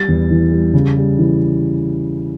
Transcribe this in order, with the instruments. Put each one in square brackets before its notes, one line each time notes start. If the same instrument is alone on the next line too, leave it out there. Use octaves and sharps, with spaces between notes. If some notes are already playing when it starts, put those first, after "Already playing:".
Already playing: [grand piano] G3 A6
E2
E3
G3
C#3
G3
E3